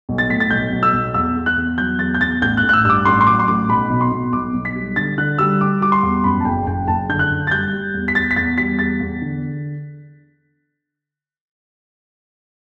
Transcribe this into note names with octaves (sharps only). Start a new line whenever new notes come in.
B1
A6
A2 B6
A6
B1 G6
B1
E6
B1
E2 E6
E2
F#6
E2
F#3 G6
E2 A6
G6
E2 A6
A1 G6
F#6
A1
F#6
E6
G2 D6 E6
A1 C6
C6
F#3 D6
C6
A1 D6
B1 B5
B2
C6
B2
B1 D6
B1
B6
G3
D3 A6
D3 F#6
G3 E6
G3 D6
G3 D6
C6
E2
F#2 B5
A5
F#1 G5
F#1 G5
F#1 A5
D3 G6
F#6
F#1
A6
G3 G6
G3
E2
B6
E2 A6
B6
E2 A6
G3 B6
E2 A6
E2
D3